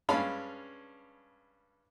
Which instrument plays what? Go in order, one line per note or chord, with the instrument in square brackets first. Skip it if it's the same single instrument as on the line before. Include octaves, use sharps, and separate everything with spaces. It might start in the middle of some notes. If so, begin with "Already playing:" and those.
[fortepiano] G2 G#3 C#4 F5 A5 B5